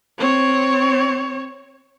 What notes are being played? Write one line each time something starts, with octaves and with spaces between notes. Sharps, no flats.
C4 C#5